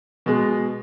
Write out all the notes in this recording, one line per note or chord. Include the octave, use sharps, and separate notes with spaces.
B2 G#3